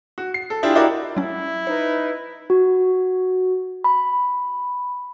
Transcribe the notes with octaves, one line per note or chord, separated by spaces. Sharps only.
F#4
C7
A4
D4 E4 F4 G4 G#4
D#4 E4 F#4 G4 A#4 D5
F#3 C#4 E4
D#4 B4 C5
F#4
B5